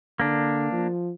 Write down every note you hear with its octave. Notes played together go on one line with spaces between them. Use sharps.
D3 A#3 D4
F3